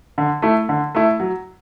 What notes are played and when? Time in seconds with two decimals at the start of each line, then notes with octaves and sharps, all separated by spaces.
0.18 D3
0.42 A3 E4
0.69 D3
0.95 A3 E4
1.20 F#3